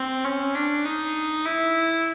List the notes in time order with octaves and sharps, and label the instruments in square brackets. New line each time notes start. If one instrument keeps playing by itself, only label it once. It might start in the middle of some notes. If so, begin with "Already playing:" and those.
Already playing: [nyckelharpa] C4
C#4
D4
D#4
E4